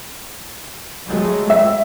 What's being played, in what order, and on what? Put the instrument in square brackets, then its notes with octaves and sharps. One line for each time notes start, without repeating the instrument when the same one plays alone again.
[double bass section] F#3 G#3 A3
[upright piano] E5